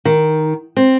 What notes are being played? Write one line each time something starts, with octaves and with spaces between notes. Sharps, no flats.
D#3
C4